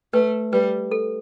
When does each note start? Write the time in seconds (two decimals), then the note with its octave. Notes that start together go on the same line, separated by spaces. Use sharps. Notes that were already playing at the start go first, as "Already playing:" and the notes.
0.13 A3 B4
0.53 G3 B4
0.91 A4